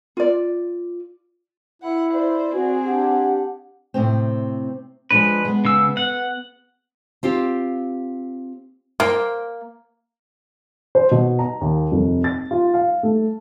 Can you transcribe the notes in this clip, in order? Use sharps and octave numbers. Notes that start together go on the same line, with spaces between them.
F4 D5
E4 F#5
C5 D5
C4 F#4 G#4
D4 G4 F#5
A2 C3 C4
F3 G#3 D4 B4
G#3 B3
C#3 E6
B3 F#5
C4 F4 G4
A#3 C5 G5
C5
B2
A#5
D#2
F1
A6
F4
F5
A3